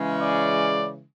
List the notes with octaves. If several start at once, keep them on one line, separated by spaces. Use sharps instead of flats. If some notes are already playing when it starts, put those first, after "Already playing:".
Already playing: C#3 E3 G#3 C#4
D5